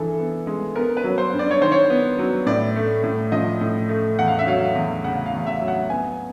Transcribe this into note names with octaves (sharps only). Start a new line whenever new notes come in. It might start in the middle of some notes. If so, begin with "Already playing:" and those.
Already playing: G2 E3 G#4 A4
B3
G#3
B3 A#4
B4
F#3
C5
G2
D5
C#5
D#3 C5
C#5
B3
F#3
A2 D5
A3
A2
F3 D#5
A2
A3
E2 F#5
F5
E5
F#3 F5
E2
C#3 F#5
F5
E2
E5
F#3
F#5
B3 G#5